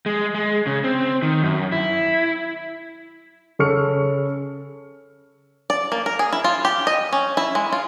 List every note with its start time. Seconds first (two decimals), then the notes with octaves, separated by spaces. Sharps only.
0.06 G#3
0.35 G#3
0.67 C#3
0.84 C4
1.22 D#3
1.43 F#2
1.72 E4
3.59 C#3 A4 C#6 F6 C#7
5.70 D5
5.92 A#3
6.06 A#4
6.19 G#4
6.32 E4
6.44 F4
6.65 G4
6.87 D#5
7.12 C#4
7.37 E4
7.55 G#3
7.72 F4